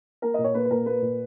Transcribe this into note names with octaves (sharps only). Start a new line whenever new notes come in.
A#3 A#4
A#2 D#5
C#5
A#3 B4
B4
A#2 A#4
A#3 B4
A#2